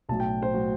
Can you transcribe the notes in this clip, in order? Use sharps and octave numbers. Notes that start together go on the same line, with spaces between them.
B1 A2 F#3 A5
G5
C5
A2 F#3 F#4